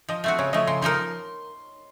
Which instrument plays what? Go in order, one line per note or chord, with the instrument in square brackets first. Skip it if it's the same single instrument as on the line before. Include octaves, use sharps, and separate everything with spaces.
[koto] F3 [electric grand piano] D#5
[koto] A3 C4 F#4
[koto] C#3 [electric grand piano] C#5
[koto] F3 A3 [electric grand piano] D#5
[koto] C#3 [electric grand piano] C6
[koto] F3 A#3 D#4 A#4 [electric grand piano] C6